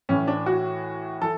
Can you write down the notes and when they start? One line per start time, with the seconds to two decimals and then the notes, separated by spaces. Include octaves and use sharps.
0.09 A2 E3 C#4
0.28 D4
0.46 F#4
1.22 E3 A4